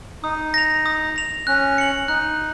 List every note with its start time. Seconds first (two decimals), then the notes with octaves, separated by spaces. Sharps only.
0.23 D#4 D#6
0.54 A#6 F7
0.86 D#6
1.16 A#6 F7
1.47 C#4 F#6
1.78 C#7 F#7
2.08 D#4 F#6